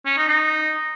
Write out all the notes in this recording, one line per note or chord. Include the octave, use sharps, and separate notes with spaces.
C#4
D#4
D#4